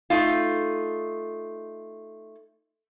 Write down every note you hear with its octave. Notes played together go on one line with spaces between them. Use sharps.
A3 D#4 F4